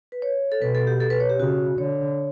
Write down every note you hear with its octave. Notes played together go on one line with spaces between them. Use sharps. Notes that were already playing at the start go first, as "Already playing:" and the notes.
B4
C#5
A4
B2 B4
A4
G4
A4
B4
C#5
G4
C#3 F#4
D3 C#5